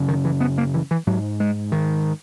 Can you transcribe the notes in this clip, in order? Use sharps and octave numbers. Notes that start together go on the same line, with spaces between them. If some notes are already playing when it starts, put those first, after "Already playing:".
Already playing: F#2 C#3
D#3
E3
B3
A#3
E3
E3
G#2 F#3
G#3
D#3